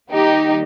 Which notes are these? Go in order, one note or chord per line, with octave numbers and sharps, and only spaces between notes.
D#3 G3 A#3 D#4 G4